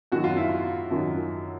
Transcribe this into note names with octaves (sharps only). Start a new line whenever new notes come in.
F#2 D#3 F#3 F#4
F4
E4
F4
F#2 D#3 F#3